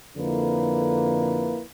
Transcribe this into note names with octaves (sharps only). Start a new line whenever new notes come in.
F2 D3 A#3 E4 B4